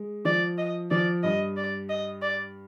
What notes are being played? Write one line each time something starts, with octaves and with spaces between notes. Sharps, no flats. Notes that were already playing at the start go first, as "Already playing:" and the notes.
Already playing: G#3
F3 D5
D#5
F3 D5
G2 D#5
D5
D#5
D5